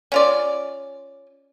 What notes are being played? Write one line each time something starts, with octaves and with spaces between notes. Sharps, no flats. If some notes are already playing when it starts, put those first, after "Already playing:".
C#4 F4 D5